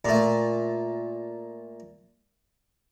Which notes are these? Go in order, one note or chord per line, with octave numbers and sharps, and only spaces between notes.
A#2 A3